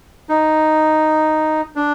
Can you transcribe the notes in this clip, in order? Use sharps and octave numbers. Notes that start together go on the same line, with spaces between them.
D#4
D4